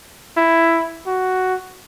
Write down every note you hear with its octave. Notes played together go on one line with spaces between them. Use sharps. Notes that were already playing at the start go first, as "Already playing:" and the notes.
E4
F#4